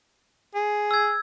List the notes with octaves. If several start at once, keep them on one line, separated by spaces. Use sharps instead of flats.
G#4
E6 G#6